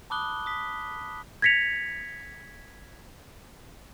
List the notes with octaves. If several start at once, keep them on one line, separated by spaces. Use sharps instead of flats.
A5 B5 D6 D#6 F#6 G7
D#6 B6
G#6 A#6 B6 C#7 F7